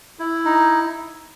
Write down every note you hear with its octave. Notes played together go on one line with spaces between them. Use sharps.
E4
D#4